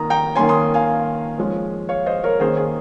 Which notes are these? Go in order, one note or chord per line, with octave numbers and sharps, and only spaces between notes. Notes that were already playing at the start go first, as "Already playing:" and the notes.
Already playing: D#3 A#3 A#5 D#6
G5 A#5
D#3 A#3 C#4 G#5 C6
C6 D#6
F5 G#5
F3 G#3 C#4
C#5 F5
C5 D#5
A#4 C#5
D#3 A#3 C#4 G#4 C5
G#4